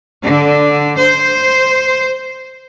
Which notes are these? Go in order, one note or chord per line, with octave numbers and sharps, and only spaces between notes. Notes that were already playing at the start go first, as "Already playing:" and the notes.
D3
C5